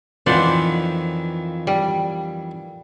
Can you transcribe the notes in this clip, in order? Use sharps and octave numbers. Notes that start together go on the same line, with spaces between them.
F2 D#3 E3 C5 D5 F#5
G3